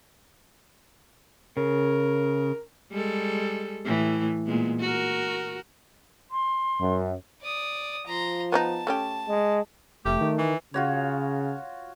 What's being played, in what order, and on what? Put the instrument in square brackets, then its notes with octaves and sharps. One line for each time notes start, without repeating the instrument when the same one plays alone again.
[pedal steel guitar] C#3 [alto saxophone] A#4
[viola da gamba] G3 G#3 A4
A2 E3
A#2 G#3 B3
F#4 A#4
[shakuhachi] C6
[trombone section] F#2
[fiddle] D5 D#6
[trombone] F3 [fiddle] A#5 C6
[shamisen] B3 C#4 D#4 [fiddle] A5
[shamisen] A3 C#4 G4
[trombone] G#3
[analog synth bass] F1 [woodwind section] A3 [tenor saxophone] G4
[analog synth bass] D#3
[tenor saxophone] E3
[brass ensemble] C#3 [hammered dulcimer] F4 F#4 C#5